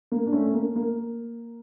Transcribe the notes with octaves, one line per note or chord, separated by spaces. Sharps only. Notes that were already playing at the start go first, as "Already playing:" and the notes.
A#3
D4
A3 C#4
A#3
A#3